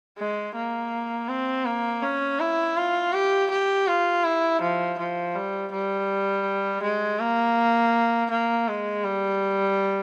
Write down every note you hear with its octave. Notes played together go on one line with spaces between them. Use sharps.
G#3
A#3
C4
A#3
C#4
E4
F4
G4
G4
F4
E4
F3
F3
G3
G3
G#3
A#3
A#3
G#3
G3